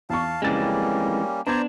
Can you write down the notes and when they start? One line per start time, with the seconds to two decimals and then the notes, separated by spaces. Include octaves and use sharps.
0.10 E2 F5 A5 C#6
0.42 F2 C#3 E3 G3 G#3 A#3 C#4 A6
1.47 B3 D4 C5 D5 A#5 G#6